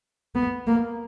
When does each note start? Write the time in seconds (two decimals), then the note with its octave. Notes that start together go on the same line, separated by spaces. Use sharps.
0.35 B3
0.66 A#3